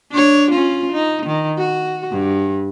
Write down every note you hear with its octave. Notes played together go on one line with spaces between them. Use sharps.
D4 C#5
C#4 F4
D#4
D#3
F#4
G2